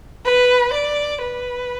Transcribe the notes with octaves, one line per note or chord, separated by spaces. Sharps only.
B4
D5
B4